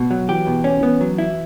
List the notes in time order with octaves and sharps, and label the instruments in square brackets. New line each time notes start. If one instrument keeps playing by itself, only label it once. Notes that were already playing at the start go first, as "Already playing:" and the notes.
Already playing: [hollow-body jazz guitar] B2
F#3
[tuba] E3 [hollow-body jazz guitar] G4
[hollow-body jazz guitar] B2
C#4
[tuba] E3 [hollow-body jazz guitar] B3
[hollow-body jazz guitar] F#3
E4